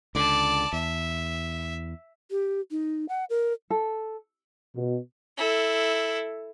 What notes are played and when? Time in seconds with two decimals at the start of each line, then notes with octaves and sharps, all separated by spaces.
0.15 C#2 D3 D5 A5
0.73 E2 E5
2.31 G4
2.71 D#4
3.09 F#5
3.30 A#4
3.70 A4
4.76 B2
5.38 E4 A4